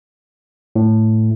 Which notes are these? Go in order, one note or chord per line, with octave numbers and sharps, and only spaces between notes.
A2